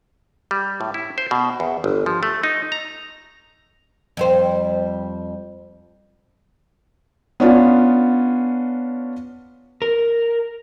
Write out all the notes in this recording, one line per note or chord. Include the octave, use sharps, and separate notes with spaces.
G3
A2
E4
C5
B2
E2
G1
F3
A3
D#4
A#5
F2 G3 C5
B3 C#4 D4 F4
A#4